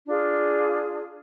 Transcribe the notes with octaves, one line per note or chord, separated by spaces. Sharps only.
D4 F4 G#4